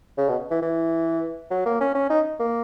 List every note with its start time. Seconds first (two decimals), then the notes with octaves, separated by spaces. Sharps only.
0.18 C#3
0.29 B2
0.51 E3
0.62 E3
1.51 F#3
1.65 A#3
1.80 C#4
1.95 C#4
2.10 D#4
2.40 A#3